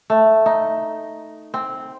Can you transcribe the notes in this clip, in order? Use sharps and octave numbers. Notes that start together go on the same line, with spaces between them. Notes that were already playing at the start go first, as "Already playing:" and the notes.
A3
D#4
C4